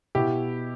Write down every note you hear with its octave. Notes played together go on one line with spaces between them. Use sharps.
B2 E4 G4